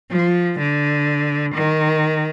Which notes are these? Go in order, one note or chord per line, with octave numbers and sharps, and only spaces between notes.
F3
D3
D#3